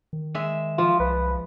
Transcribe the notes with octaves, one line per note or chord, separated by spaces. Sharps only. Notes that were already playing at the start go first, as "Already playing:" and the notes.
D#3
G#3 E5
F3 F4
C2 B4